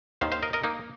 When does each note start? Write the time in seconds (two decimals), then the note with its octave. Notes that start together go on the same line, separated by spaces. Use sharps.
0.21 D#2 D#3 C5 F5
0.32 C5 F5
0.43 A#4 D#5
0.53 A#4 D#5
0.64 A#3 D#4